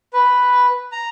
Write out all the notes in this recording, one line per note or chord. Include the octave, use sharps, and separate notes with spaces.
B4
A#5